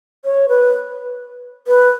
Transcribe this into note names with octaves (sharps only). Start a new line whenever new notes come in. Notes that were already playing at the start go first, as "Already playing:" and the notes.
C#5
B4
B4